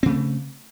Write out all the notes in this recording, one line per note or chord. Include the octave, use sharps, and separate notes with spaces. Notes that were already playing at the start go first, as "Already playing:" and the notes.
C#3 A3 C4